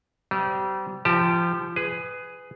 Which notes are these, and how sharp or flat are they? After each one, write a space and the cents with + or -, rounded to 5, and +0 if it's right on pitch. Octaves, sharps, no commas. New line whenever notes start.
G3 -30 C4 -35
F3 -25 G4 +0 A5 +25
G#4 +0 B4 +20